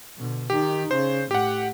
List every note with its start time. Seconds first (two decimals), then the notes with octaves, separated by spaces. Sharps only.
0.17 B2 D3
0.50 D#3 D#4 G4
0.91 C#3 C5
1.31 A2 G4 F#5